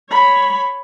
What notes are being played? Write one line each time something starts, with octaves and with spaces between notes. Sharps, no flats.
C#5 B5